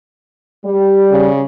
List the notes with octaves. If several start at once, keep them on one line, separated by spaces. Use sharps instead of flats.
G3
C#3